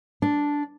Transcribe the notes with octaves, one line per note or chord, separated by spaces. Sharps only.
D4